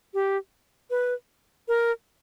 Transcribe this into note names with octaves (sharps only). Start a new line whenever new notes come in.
G4
B4
A#4